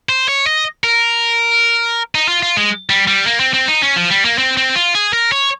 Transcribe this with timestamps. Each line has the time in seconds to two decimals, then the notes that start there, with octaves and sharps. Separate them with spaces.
0.09 C5
0.28 C#5
0.47 D#5
0.84 A#4
2.15 D#4
2.28 F4
2.43 F4
2.57 G#3
2.90 G3
3.07 G3
3.26 A#3
3.40 C4
3.54 C4
3.68 D#4
3.82 C#4
3.96 F3
4.10 G3
4.25 A#3
4.38 C4
4.57 C4
4.76 F4
4.95 G#4
5.13 A#4
5.32 C#5